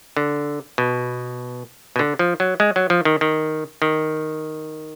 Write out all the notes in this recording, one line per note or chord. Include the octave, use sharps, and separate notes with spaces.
D3
B2
B2
D3
F3
F#3
G#3
F#3
F3
D#3
D#3
D#3